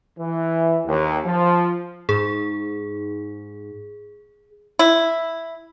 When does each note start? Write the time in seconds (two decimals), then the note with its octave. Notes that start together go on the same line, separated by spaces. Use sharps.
0.18 E3
0.85 D#2
1.25 F3
2.09 G#2 G#4
4.79 E4